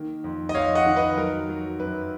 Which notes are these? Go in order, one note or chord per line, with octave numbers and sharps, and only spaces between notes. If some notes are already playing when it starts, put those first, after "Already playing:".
Already playing: D#3 A#3
F2
D#5
F2 C#5 F5
D#5 F#5
D#3
B4 D#5
F#3 A#4
F#3
F#2 B4